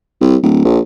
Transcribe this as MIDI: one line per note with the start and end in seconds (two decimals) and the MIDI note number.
0.21 0.36 36
0.43 0.65 26
0.65 0.79 34